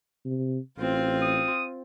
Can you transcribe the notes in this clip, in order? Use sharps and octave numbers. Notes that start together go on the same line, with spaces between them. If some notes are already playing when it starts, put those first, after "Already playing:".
C3
A1 C4 F4
D#6